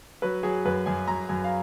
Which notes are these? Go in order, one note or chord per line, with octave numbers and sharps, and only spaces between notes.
F#3 B4
F#3 G#4
F#2 B4
F#2 G#5
F#2 A#5
F#2 G#5
F5